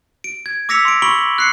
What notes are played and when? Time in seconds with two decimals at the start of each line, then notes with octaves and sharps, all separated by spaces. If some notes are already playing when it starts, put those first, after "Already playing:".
0.24 D7
0.46 G#6
0.69 D6 E6 A#6 B6 C#7 F7
0.85 C6 D7
1.02 B5 C#6 D7 F#7 G7
1.38 F#6 C7 C#7